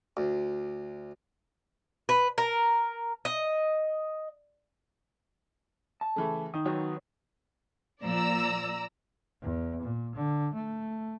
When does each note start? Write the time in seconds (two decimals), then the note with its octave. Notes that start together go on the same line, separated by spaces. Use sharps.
0.17 D2
2.09 B4
2.38 A#4
3.25 D#5
6.01 A5
6.16 C#3 E3 A3 A4
6.54 D#3 D#4 D#6
6.65 D#3 F#3 B3 C#5
8.02 A#2 F3 D5 A#5 E6
9.42 E2
9.82 A#2
10.15 D3
10.53 A3